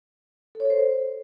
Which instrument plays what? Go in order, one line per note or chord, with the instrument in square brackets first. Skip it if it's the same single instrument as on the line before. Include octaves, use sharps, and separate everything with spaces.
[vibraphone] A4
C#5
A4
C5